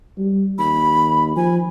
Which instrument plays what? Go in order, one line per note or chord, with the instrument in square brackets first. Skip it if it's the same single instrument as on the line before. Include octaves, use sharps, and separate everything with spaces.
[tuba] G3
[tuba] D#2 [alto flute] B5
[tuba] F3 [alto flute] G#5